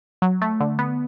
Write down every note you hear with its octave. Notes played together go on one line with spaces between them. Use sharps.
F#3
A3
D3
B3